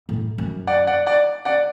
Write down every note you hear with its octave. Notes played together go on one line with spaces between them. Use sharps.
A2
F#2
D5 F#5
D5 F#5
D5 F#5
D5 F#5